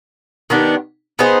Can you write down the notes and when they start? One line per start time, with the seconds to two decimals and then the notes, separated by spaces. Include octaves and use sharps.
0.50 D#3 B3 D4 G4
1.19 B3 D#4 G#4 C5